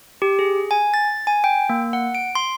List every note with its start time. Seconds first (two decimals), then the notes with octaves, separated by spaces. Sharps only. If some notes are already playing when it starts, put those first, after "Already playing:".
0.22 G4
0.39 G#4
0.71 G#5
0.94 A6
1.27 G#5
1.44 G5
1.69 A#3
1.93 F#5
2.15 D7
2.35 C6